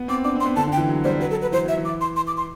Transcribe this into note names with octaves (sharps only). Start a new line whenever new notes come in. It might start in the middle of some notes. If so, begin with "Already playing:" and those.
Already playing: B3
C4 D6
D4 D6
C4 C6
B3
D3 A5
D3 G5
E3
F#3
G3 C5
F#3 B4
A4
B4
E3 C5
F#3 E5
E3
D6
C6
C6
D6
C6